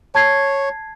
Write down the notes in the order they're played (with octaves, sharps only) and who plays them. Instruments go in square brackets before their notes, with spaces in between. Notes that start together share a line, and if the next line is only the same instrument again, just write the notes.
[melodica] C#5 [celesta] A5 G#6 C7